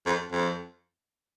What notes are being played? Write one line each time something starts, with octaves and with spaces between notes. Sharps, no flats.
F2
F2